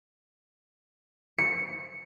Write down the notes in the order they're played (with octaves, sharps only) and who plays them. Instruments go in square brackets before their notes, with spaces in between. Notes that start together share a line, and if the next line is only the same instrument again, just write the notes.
[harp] C#7